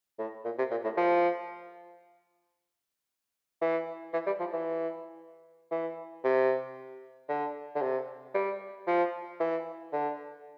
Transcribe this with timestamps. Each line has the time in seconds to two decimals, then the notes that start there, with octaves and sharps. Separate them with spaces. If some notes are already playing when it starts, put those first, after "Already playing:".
0.19 A2
0.45 A#2
0.58 C3
0.71 A#2
0.84 A2
0.97 F3
3.61 E3
4.13 E3
4.26 G3
4.40 F3
4.53 E3
5.71 E3
6.24 C3
7.29 D3
7.75 D3
7.82 C3
8.34 G3
8.87 F3
9.40 E3
9.93 D3